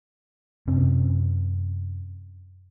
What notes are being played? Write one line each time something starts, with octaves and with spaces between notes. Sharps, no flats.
F#2 C3 C4 C#4